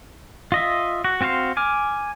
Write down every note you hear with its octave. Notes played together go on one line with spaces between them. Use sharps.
F4 D#5 E5
F#4
C4 F#4 C5 F5 C6
G#5 D6 F6